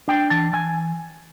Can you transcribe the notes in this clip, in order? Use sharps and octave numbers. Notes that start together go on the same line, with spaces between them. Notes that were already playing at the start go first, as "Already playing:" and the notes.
D4 G5
E3 A5
E3 G#5